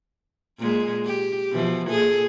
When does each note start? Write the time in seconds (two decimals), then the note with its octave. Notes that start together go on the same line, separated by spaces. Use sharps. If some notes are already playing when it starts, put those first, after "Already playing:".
0.58 A#2 G#3
1.05 G4
1.51 B2 E3 F3
1.89 A#2 G#4 A4